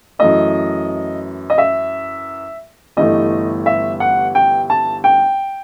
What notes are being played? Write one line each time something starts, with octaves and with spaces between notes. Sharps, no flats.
F#2 E3 A3 D#5
D#5
E5
G1 G2 E3 A3 D#5
E5
F#5
G5
A5
G5